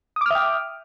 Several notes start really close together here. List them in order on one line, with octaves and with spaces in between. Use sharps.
D#6 D6 F6 E5 G5